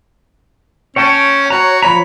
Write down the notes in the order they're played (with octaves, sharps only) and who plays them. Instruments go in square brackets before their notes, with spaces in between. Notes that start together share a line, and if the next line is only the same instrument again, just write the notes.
[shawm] C#4 [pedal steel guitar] C#5 G5 A5
[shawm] F#4 [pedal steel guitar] C#5 A#5
[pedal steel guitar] F3 C#5 A#5 [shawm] B5